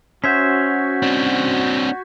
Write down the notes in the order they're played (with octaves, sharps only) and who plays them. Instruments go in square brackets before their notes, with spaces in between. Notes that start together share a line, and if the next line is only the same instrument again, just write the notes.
[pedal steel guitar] C#4 C5 E5 [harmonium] F#4 [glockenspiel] G6 G#6 B6
[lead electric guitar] C4 D4